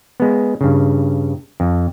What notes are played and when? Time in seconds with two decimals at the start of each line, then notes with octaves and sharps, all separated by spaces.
0.20 G#3 B3
0.61 G2 C#3
1.60 F2